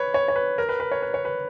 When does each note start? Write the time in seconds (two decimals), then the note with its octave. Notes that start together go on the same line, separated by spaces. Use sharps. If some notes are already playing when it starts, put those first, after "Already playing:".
Already playing: B4 C#5
0.14 C#5
0.28 C#5
0.36 B4
0.58 A#4
0.69 B4
0.80 B4
0.92 C#5
1.02 B4
1.14 C#5
1.25 B4